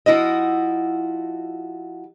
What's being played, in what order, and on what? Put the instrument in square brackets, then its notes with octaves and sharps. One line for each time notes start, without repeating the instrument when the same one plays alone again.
[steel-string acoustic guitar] F3 E4 F#4 D#5